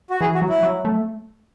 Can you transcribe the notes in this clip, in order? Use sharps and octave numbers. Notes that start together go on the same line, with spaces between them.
F#4
E3 G#4
F#4
F#3
E4
F#3
A3